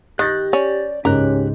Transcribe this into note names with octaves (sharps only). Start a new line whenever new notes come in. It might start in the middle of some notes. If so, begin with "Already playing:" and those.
D#3 G4 F#6 G6 A6 A#6
C#4 D5
C#2 G#2 C#4 G4 A#4 F#6